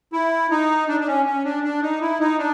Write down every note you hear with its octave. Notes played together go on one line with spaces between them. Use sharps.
E4
D#4
D4
D4
C#4
C#4
D4
D4
D#4
E4
D#4
D4